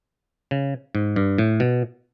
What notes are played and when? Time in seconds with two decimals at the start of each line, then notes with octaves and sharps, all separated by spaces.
0.51 C#3
0.95 G#2
1.16 G2
1.38 A2
1.60 B2